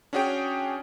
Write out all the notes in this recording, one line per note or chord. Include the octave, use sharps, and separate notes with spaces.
C#4 D4 F#4 G#4 C#5 G5